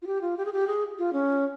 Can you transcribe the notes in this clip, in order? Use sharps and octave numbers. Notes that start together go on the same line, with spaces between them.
F4
G4
F4
G4
G#4
G4
G#4
F4
C#4